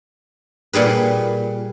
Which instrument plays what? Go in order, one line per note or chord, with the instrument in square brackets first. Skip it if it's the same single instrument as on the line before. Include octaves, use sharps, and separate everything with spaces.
[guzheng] A#2 G3 G#4 B4